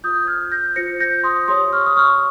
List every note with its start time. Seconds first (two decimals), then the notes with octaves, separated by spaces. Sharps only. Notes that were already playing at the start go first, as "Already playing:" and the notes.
0.04 F4 C5 D#6 G6
0.27 F6 G#6
0.52 G6 A#6
0.76 F4 C5 A#6 C#7
1.00 G6 A#6
1.24 C6 D#6
1.48 G4 C#5 C6 D#6
1.73 C#6 F6
1.86 D#6
1.96 C#6 F6